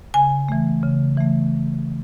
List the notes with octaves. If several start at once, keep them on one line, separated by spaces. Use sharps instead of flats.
C#3 G#5
E3 A3
C#3
E3 A3